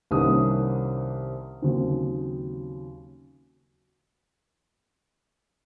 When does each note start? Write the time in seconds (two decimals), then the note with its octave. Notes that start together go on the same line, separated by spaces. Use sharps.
0.11 C2 C3 D#3 A#3 C#4 D#6
1.62 D#2 C#3 F#3 C4